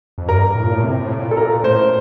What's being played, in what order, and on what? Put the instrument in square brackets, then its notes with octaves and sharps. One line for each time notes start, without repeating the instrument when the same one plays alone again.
[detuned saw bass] F2
[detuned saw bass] G2 [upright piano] A#4
[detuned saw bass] A2
A#2
A2
C3
A2
A#2
[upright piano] A4
[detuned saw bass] A#2 [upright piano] A#4
[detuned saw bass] A2 [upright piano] C5